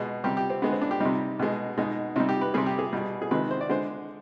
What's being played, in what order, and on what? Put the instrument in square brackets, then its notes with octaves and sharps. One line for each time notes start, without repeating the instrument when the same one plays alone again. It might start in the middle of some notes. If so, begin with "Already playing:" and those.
Already playing: [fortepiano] B2 G#3
C3 G3 G4
G4
C4
D3 G#3 B3
C4
D4
G4
C3 G3 D#4
B2 G#3
B2 G#3 D#4
C3 G3 D#4
G4
B4
C3 G3 G#4
G4
G#4
B2 G3
G#4
C3 D#3 G#3 B4
C5
D5
D3 G#3 C5